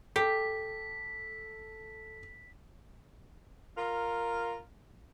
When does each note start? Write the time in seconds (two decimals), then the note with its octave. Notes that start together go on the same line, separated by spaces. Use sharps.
0.16 G4 A4 B6
3.78 F4 A#4